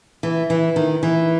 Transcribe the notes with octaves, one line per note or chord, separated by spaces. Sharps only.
E3
E3
D#3
E3